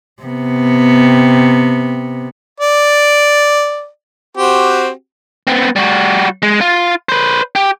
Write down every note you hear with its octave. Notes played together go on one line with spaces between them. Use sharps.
C3 B3
D5
C4 F#4 G4
B3 C4
G3 F#4
G#3
F4
B4 C5
G4